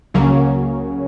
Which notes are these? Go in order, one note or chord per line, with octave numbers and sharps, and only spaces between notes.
C#2 C#3 F#3 A#3 C#4